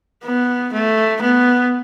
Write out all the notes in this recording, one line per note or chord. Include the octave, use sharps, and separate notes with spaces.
B3
A3
B3